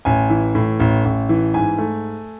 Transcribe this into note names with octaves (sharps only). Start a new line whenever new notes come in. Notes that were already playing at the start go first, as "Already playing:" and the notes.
A1 G#5
E3
A2
A1
A1
E3
G#2 G#5
A3